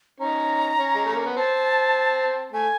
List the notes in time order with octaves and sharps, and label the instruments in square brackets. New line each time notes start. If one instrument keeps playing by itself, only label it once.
[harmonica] C#4 D#4 [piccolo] A#5
[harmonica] C#4
G#3
A3
A#3
B3
[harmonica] C4 [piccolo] A5
[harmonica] A3 [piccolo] G#5